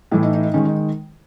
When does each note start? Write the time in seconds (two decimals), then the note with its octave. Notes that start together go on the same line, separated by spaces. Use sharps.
0.11 A2 E3 A3 E4
0.23 D#4
0.33 D#4
0.44 D#4
0.54 D#3 G#3 C#4
0.65 D#4